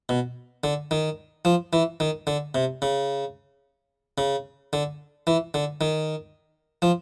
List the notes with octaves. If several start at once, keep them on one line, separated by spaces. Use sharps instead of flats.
B2
D3
D#3
F3
E3
D#3
D3
C3
C#3
C#3
D3
E3
D3
D#3
F3